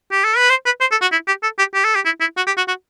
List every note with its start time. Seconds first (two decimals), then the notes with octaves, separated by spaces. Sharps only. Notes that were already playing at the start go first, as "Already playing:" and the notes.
0.12 G4
0.24 A4
0.37 B4
0.50 C5
0.66 B4
0.81 C5
0.92 A4
1.02 F#4
1.12 E4
1.28 G4
1.43 A4
1.59 G4
1.74 G4
1.85 A4
1.95 G4
2.06 E4
2.21 E4
2.37 F#4
2.47 G4
2.57 F#4
2.68 F#4